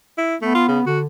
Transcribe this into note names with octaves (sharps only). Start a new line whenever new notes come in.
E4
A3 B3
F4
C#3
D3 F#4